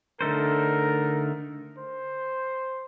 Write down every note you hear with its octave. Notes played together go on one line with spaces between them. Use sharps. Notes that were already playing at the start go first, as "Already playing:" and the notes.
D3 A3 D#4 A4 A#4 C5
C5